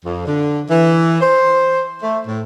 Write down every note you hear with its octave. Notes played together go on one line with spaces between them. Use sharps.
F2
D3
E3
C5
A3
A2